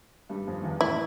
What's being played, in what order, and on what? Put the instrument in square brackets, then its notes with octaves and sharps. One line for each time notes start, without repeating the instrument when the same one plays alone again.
[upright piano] G2 G3
F2 F3
E2 E3
[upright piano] A2 [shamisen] E4